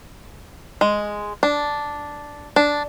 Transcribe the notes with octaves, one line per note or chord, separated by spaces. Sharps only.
G#3
D4
D4